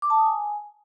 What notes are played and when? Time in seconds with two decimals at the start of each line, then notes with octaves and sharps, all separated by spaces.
0.02 D6
0.10 A5
0.18 D#6
0.26 G#5